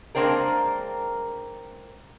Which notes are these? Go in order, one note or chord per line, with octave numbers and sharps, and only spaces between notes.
G#3 A#3 C4 D4 A#4